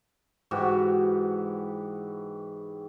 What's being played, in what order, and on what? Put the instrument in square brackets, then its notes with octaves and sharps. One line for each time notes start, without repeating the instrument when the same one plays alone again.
[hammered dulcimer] G#2 E3 F#4 G4